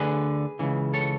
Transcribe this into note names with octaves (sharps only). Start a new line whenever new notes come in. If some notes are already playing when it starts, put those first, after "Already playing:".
Already playing: D2 D3 G#4 B4
C#2 C#3 E3
A4 C#5